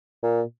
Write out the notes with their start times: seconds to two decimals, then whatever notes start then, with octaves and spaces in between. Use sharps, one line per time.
0.23 A#2